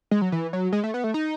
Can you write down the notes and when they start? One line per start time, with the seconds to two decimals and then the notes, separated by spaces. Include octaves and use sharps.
0.11 G#3
0.22 F#3
0.32 E3
0.53 F#3
0.72 G#3
0.84 A3
0.94 B3
1.04 A3
1.14 D#4